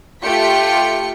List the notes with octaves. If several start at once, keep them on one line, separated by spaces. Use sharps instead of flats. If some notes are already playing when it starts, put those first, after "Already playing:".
A3 F4 G4 G5 B6 C#7